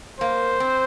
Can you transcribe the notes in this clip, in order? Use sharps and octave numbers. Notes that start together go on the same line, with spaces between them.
A#3 C5
C4